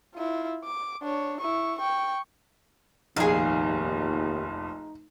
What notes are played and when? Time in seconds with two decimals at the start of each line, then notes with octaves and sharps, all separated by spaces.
0.15 E4 F4
0.64 D6
1.02 D4 C#5
1.41 E4 C#6
1.78 G5 C#6
3.16 F1 A#1 D#2 D#4 G#4 F5